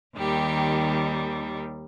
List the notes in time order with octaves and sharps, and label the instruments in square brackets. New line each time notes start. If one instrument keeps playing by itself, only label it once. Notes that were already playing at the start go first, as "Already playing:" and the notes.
[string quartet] D#2 D#3 G3 G4